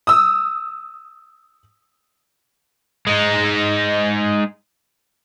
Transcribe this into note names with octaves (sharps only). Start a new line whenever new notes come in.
D#6 E6
G#3 D#4